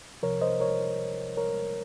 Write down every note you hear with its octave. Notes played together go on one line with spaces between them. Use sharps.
C2 C3 F3 A#4 C#5
C5 D#5
A#4 C#5
A#4 C#5